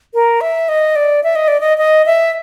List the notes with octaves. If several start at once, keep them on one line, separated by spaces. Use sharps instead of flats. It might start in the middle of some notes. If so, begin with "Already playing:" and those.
A#4
E5
D#5
D5
E5
D#5
D5
D#5
D#5
E5